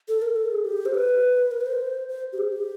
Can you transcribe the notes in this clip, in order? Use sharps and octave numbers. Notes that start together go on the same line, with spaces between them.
A4
A#4
A4
G#4
G4
C5
B4
A#4
B4
C5
C5
G4
G#4
G4